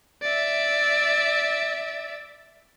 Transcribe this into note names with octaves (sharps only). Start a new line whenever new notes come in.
D5 E5